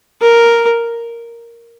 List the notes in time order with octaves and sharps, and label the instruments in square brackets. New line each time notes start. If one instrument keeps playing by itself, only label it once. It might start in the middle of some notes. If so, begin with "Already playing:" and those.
[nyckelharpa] A#4